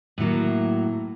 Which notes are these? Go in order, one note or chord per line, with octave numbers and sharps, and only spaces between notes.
A2 F#3 A#3